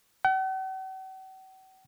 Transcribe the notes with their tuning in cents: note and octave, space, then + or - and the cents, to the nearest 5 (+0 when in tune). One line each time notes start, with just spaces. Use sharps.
F#5 +45